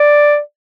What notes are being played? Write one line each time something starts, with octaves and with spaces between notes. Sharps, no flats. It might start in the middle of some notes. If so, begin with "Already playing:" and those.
Already playing: D5